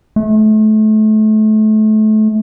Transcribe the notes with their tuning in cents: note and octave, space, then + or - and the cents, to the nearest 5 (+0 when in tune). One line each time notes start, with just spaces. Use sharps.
A3 -30